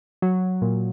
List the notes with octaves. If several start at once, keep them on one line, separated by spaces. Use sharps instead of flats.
F#3
A#2